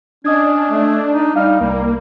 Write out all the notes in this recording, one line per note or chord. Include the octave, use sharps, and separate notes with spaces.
C#4 D4 D#5 D#6 G#6
A3
D#4
G3 D#4 F5 F6
C2 G3 A#3